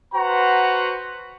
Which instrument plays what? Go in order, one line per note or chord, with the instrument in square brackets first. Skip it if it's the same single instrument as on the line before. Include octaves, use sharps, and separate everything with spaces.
[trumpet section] F#4 B4 C5 F#5 A#5 C6